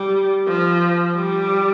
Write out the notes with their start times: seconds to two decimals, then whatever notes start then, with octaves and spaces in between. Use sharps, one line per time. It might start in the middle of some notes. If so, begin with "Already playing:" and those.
Already playing: G3
0.47 F3
1.16 G3